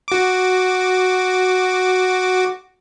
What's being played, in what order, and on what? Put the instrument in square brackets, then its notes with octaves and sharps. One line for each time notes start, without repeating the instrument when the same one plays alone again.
[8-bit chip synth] F#4 D6